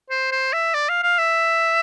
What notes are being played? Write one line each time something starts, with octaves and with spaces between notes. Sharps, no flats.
C5
C5
E5
D5
F5
F5
E5